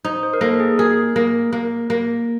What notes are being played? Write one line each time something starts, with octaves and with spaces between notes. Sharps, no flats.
D#4 C5
C5
A#4
A#3 A4
G#4
G#4 A#4
A#3
A#3
A#3